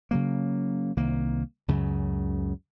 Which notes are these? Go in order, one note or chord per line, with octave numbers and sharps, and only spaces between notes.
C#3 F#3 A#3
C2 D#3 A#3
C#2 F#2 C#3